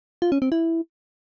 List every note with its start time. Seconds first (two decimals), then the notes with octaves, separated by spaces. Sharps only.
0.22 F4
0.32 C#4
0.42 C4
0.52 E4